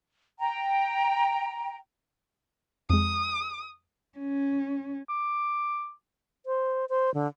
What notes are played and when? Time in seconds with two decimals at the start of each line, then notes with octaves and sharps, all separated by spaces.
0.39 G5 A#5
2.90 F2 G#3 D#6
4.18 C#4
5.09 D6
6.46 C5
6.89 C5
7.14 D3